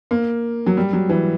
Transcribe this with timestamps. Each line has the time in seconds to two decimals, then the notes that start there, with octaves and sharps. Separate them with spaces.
0.11 A#3
0.66 F#3
0.77 G3
0.93 F#3
1.09 E3